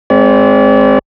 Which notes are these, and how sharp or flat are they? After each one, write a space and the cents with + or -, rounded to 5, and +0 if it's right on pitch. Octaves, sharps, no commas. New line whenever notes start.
G#3 +10 C4 +0 D5 -40